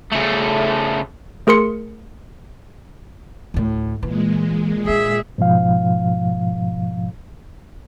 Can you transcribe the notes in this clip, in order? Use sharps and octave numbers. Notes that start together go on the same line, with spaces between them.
C#3 A3
A3 G#4 A#4 C6 C#7
D2 A2
A#2 E3 G#3
D#3 D4 G#4 E5
G#2 B2 F3 F5